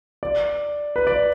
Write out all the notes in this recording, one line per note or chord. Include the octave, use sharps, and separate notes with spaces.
D5
B4
D5